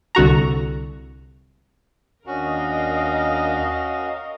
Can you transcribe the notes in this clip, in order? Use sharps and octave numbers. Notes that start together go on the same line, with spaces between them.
C2 D3 F#4 A#5
D#2 C#4 D4 F#4 A#4 D#5 F5